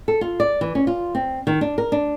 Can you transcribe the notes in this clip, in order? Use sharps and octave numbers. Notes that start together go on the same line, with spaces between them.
A4
F4
D5
E3
C#4
F4
C4
D#3
D4
A#4
D4